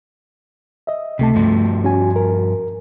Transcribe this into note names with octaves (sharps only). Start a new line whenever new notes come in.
D#5 E5
C#2 C3 A3 A5
G2 F3
C#4 F#4 G#5
A#4